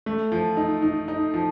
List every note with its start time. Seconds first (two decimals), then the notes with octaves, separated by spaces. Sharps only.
0.06 A3
0.32 F3
0.57 D#4
0.82 D#4
1.08 D#4
1.34 F3